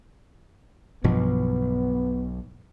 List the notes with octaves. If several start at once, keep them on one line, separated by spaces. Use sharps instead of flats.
B1 G2 B2 F3 B3